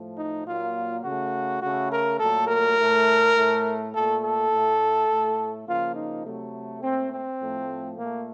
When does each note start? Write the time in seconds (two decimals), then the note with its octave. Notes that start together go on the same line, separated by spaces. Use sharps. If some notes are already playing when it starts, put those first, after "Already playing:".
Already playing: A2 F3 A3
0.18 D#4
0.46 A#2 F#3 A#3 F4
1.03 C#3 A3 F#4
1.62 C#3 A3 F#4
1.91 A#4
2.20 A#2 F#3 A3 A4
2.48 A#4
2.77 A2 A3
3.35 A2 A3
3.93 A#2 A3 A4
4.22 A4
4.51 A2 A3
5.08 A2 A3
5.67 C#3 F3 A#3 F4
5.96 D#4
6.24 C3 F#3 A3
6.82 A#2 A3 C4
7.12 C4
7.40 A2 F3 A3
7.98 A#2 A3 A#3